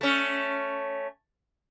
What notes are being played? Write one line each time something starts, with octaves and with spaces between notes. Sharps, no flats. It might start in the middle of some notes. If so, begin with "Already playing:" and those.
A3 C#4